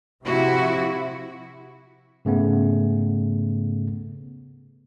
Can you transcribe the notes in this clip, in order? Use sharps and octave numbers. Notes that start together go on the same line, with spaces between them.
C3 F3 E4 F#4
G#2 C#3 A3 B3